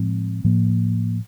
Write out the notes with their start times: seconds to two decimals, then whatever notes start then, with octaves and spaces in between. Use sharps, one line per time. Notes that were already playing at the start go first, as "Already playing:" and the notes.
Already playing: A2 F3 G#3 C4
0.44 A2 F3 A#3